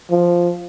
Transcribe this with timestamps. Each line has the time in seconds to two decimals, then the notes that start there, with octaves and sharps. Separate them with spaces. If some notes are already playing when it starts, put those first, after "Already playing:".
0.11 F3